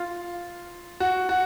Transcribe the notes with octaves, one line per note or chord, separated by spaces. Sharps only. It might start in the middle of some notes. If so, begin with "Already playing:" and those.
Already playing: F4
F#4
F#4